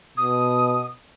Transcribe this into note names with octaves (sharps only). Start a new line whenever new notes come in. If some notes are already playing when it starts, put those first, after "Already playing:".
B2 D#6